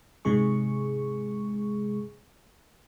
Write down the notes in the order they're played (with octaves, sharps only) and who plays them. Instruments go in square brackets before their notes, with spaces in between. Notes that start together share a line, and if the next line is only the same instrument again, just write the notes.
[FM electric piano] G#2 C3 G#3 G#4 C#6